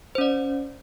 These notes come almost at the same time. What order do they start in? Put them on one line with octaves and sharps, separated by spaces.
C5 C#4 D5